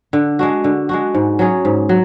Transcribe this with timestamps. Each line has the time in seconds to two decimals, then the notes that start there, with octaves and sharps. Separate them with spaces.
0.13 D3
0.39 G#3 D4 F#4
0.64 D3
0.89 G#3 D4 F#4
1.15 G#2
1.39 F#3 C#4 G#4
1.65 G#2
1.89 F#3